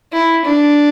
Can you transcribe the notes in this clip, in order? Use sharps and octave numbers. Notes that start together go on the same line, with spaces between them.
E4
D4